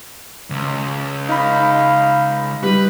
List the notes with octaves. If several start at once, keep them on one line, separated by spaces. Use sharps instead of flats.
C#2
D#4 F5 B5
G3 B4